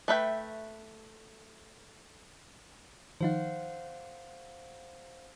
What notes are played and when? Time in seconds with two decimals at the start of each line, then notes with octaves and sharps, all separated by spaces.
0.08 A3 B4 E5 G5
3.21 D#3 F3 D#4 C5 F5 F#5